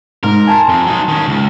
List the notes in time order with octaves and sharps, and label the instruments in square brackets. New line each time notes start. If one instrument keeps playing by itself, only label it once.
[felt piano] G#2 [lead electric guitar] A#4
[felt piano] G#5 A5 C6
[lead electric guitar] F2
F#3 D#4
D#3 C#4
C#2